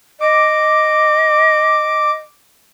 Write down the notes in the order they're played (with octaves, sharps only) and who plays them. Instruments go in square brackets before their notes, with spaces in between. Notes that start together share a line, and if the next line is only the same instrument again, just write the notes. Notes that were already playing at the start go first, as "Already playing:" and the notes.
[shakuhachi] D#5 [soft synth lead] D6